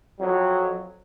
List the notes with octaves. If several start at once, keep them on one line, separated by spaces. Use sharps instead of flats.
F2 F#3